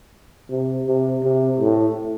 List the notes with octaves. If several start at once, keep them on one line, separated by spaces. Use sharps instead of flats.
C3
C3
C3
A2